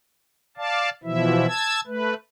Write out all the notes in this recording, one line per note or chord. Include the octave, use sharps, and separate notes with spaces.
D5 F5 A5
B2 E3 F3 E4 E5
A5 E6 G#6
A3 B4